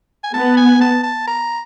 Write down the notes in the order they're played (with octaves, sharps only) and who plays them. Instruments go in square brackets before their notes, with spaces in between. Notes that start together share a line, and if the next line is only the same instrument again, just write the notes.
[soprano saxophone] G#5
[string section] B3 [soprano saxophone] A5
[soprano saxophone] G#5
A5
A5
A#5